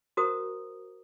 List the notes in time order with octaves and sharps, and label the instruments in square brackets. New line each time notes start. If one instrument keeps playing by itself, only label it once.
[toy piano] F#4 A#4 C5 A#5 D#6